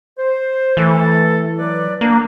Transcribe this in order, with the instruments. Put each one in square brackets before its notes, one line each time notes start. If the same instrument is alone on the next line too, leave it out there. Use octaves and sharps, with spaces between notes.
[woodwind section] C5
[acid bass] E3 [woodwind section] A3 A4
[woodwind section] F#3 B4 D5
[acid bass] A#3 [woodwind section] B3 D4